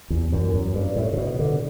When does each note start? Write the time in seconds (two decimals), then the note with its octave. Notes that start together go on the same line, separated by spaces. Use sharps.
0.10 E2
0.32 F#2
0.54 F#2
0.74 G2
0.96 A2
1.13 C3
1.17 B2
1.39 D3